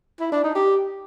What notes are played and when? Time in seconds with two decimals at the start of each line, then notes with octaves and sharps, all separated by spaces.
0.20 E4
0.32 D4
0.44 D#4
0.55 G4